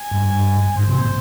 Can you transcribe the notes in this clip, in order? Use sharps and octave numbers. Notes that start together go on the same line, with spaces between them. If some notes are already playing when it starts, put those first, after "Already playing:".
Already playing: G#5
G2
G#2 C5
C3
A#2